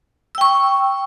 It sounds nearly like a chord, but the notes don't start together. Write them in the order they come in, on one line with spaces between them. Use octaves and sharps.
E6 G5 C#6